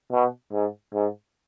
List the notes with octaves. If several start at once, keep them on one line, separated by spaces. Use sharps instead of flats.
B2
G#2
G#2